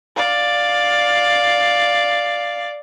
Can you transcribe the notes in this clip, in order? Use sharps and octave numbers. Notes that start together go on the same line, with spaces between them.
D5 F5